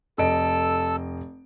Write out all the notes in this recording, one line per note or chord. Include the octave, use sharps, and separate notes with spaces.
F1 A4 D#5 E6 D7